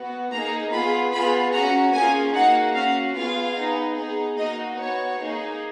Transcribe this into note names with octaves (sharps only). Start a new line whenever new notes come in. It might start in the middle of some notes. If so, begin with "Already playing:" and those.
Already playing: B3 F#4
A#3 D#4 G#4 A#5
B3 F4 G#4 B5
B3 F4 G#4 B5
C#4 F#4 A#5
A#3 C#4 F4 G#4 G#5
A#3 D#4 F#4 F#5
C#4 F#4 F5
B3 F4 G#4 F5
B3 D#4 G#4
B3 D#4 G#4
A#3 D#4 F#4 D#5
B3 F#4 C#5
A#3 D#4 G#4